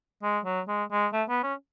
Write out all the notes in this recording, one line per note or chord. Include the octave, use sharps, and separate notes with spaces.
G#3
F#3
G#3
G#3
A3
B3
C#4